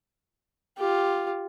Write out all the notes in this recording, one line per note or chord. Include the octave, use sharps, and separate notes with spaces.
F4 G4